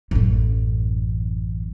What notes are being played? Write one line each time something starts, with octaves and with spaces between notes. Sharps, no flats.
A1 F#2